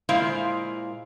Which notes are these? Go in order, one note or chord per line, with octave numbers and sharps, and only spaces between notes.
A#2 G#3 E4 A#4 C5 F5